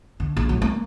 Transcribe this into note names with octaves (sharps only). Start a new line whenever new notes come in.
D3
A#1
F#3
A#3